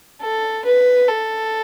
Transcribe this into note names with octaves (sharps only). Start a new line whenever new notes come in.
A4
B4
A4